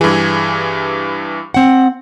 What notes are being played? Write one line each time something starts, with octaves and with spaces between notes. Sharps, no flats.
G2 E3 G#4
C4 F#5